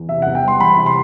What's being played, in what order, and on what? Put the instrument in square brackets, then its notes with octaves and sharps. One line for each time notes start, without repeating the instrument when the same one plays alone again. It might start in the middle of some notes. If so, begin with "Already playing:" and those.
Already playing: [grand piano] E2
C3 E5
E1 F#5
G5
G3 C6
E2 B5
C3
C6